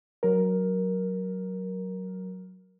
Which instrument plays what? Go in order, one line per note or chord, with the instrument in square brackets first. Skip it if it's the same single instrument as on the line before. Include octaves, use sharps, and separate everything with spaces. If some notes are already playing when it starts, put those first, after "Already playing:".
[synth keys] F#3 A#4